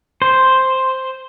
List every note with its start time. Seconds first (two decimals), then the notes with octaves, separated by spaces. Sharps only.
0.22 C5